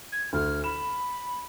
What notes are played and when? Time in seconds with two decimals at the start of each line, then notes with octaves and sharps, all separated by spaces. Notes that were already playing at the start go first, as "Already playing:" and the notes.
0.12 G#6
0.33 D2 F6
0.64 B5 E7